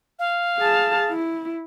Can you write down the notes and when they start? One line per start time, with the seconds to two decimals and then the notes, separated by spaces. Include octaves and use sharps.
0.19 F5
0.58 G#4 A5
1.09 E4